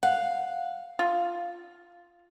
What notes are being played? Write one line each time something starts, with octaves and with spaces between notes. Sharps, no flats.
F5 F#5
F4